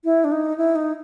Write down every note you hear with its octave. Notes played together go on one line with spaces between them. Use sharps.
E4
D4
D#4
E4
D#4